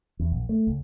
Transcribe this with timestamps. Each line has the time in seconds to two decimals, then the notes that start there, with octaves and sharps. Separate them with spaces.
0.19 E2
0.31 A#1
0.49 A3
0.67 C#2